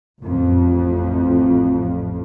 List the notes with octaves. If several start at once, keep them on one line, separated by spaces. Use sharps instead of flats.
A1 F2